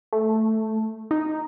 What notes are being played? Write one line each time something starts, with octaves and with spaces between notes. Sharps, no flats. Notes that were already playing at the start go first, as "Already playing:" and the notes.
A3
D#4